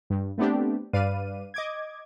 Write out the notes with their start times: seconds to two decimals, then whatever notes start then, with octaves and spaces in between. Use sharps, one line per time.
0.10 G2
0.38 A3 B3 C4 D4 G4
0.93 G2 B4 D5 F5 D#7
1.54 D#5 D6 G#6